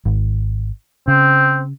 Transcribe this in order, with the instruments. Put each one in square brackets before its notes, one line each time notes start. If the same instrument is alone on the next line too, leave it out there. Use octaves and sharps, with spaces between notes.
[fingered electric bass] G#1
[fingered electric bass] C#3 [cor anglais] C4